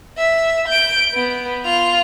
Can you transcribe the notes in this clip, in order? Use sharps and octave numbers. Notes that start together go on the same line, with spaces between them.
E5
G6 D7
B3
F4 F7